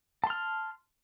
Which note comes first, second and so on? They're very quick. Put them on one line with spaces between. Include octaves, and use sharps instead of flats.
A5 C6 F6